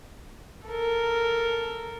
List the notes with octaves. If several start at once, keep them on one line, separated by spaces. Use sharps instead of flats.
A4 A#4